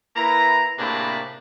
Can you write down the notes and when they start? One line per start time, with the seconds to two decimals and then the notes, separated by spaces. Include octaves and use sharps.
0.16 A#3 E4 B4 A#5
0.78 A2 C3 A#3 D4 G#4 B5